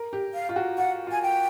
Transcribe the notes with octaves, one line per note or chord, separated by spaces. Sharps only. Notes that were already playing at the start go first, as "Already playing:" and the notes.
Already playing: A#4
G4
F5
F4
F#4
F4 F#5
F4 G#5
G5